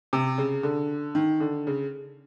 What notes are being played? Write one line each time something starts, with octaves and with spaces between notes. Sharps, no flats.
C3
C#3
D3
D#3
D3
C#3